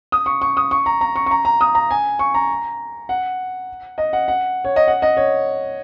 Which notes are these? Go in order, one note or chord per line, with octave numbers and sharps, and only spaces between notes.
D#6
C#6
C#6
D#6
C#6
A#5
A#5
C#6
C#6
A#5
A#5
D#6
A#5
G#5
C#6
A#5
F#5
D#5
F#5
F#5
C#5
D#5
F#5
D#5
C#5